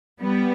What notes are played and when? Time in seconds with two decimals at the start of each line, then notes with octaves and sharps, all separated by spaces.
0.21 G3 B3